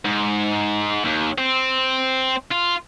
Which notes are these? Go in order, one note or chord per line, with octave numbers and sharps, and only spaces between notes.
G#2
D#2
C4
F4